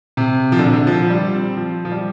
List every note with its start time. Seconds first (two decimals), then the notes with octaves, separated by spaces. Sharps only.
0.17 C3
0.52 F3
0.59 D3
0.67 C3
0.74 D3
0.87 F3
1.02 F3
1.10 G3
1.33 C4
1.57 F3
1.85 F3
1.92 G3